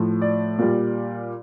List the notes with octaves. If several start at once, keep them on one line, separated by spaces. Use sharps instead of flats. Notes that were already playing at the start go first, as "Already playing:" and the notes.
Already playing: A2 F3
D5
A#2 G3